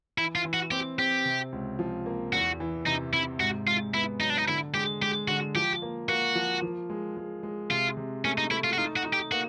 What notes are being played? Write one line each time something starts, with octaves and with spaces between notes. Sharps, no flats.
E3 E4
F4
E3
F#4
C4 G4
C4 G4
C3
C#2
F3
A#3
E2 F#4
E3
C3 D#4
C3 E4
G#2 F#4
G#2 F4
B3 E4
F#3 D#4
D4
D#4
D3 E4
G#3 G4
G#3 G4
D3 F#4
F3 G4
A#3
A#3 F#4
F3
F3
G#3
G#3
G#3
C3 F4
C3
A3 C#4
D#4
A3 E4
F4
F#4
D#4 F4
F#4
D#4
G4
A#3 F#4